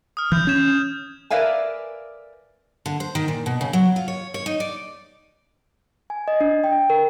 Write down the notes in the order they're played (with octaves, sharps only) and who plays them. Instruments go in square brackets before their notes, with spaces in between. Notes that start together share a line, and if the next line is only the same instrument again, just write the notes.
[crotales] D#6 F6
[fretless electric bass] E3 [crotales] G6
[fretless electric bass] C#4 [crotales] G6 G#6 E7
[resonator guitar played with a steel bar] A#4 B4 D5 E5 F5 G#5
[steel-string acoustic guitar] D3
C5
D#3
A#2
B2
C#3
F#3
F4
C#5
C#5
D#4
D5
[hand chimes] G#5
D#5
D4
G5
A#4